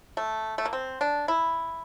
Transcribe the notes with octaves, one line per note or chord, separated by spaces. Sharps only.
A3
A3
A#3
C4
D4
E4